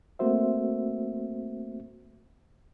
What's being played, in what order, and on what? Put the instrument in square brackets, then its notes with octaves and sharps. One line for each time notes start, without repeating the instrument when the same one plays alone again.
[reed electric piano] A3 A#3 C4 F#4 C5 E5